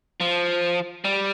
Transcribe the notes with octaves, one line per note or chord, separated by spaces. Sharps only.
F3
G3